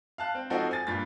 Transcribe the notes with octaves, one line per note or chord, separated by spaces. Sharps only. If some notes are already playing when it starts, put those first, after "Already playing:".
F5 A5 F#6
C4
F3 C4 D#4 F#4 A4
G#5 A6
G2 A#2 A6